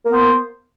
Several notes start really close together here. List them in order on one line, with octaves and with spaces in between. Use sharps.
A#3 B3 C5